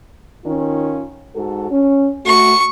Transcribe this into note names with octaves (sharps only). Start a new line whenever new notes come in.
D#3 C#4 F4
G#2 F#4 A4
C#4
A3 F#4 C#6